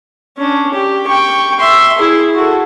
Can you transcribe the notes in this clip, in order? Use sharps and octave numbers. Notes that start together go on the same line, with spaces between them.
C#4 D4
G4
G5 C#6
E5 C6
E4 G#4
F#4 A4